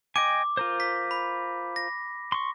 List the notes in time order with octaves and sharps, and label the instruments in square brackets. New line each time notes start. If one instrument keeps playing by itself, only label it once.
[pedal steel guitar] D#5 G5 G#5 [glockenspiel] D6
[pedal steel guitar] F4 A#4 C5
[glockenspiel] B6
B5
A#6
[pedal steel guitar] C6 C#6